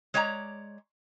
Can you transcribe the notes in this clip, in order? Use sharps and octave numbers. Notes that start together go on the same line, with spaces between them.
G#3 C#5 D5 G#5 A#5